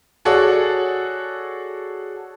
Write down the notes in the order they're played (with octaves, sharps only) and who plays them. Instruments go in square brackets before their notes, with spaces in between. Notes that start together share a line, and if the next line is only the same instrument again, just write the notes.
[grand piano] F#4 G#4 A4 C#5 D5 F#5